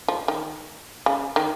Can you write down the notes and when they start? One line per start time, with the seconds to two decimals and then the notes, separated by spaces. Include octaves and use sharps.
0.08 F3
0.28 D#3
1.06 C#3
1.36 D#3